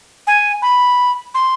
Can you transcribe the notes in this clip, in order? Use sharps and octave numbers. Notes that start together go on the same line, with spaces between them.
G#5
B5
C6